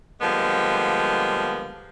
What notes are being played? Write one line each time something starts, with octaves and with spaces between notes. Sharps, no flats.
D3 F3 G3 G#3 A#3 B3